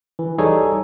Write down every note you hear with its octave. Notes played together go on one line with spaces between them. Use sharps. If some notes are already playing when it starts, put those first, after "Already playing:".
E3
G3 D#4 G#4 A4 C#5